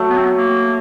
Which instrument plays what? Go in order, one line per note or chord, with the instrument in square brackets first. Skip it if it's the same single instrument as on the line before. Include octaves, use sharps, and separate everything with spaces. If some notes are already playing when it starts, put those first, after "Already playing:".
Already playing: [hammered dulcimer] F#3 A3
[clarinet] B3
C4
B3
A#3